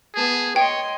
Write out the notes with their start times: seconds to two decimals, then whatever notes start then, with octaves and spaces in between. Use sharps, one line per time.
0.15 B3 G#4 A5
0.56 C#5 D#5 G5 C6